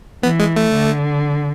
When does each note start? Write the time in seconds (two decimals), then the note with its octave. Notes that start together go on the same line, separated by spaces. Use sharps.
0.23 E3 B3
0.39 G#3
0.56 A3
0.73 D3